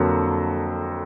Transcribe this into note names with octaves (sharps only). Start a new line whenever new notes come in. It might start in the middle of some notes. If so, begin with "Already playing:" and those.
Already playing: F2 D3 F#3 A#3